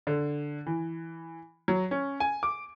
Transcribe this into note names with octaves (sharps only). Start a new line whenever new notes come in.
D3
E3
F#3
C#4
G#5
D6